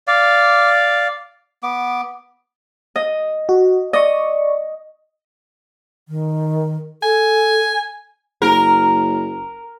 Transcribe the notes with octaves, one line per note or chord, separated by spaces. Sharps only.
D5 F5
B3 D6
D#5
F#4
D5 D#5 C#6
D#3
A4 G#5
F#1 A#4